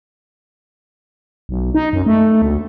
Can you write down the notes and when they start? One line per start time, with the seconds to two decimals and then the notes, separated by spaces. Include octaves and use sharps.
1.49 B1
1.74 D#4
1.93 F#2
2.06 A3
2.42 D2